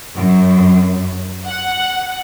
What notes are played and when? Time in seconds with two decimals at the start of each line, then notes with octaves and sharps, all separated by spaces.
0.16 F#2
1.47 F#5